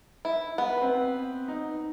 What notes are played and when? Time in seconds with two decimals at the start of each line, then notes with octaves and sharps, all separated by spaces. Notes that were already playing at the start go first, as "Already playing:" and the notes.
0.25 E4
0.58 B3
0.78 C4 B4
1.48 D#4